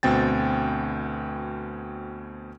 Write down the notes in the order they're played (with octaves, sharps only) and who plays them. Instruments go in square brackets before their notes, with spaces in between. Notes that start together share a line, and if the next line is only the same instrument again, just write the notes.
[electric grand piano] D2 B2 C4 G5 A6